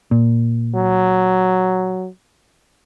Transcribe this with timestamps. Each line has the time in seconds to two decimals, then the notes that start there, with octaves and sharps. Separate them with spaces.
0.11 A#2
0.75 F#3